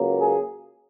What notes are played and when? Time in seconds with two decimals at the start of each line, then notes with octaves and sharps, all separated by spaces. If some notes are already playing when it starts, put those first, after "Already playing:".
Already playing: C#2 C#3 F#3 A#3
0.18 G#4